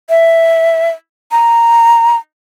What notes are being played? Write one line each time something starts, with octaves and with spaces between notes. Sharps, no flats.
E5
A#5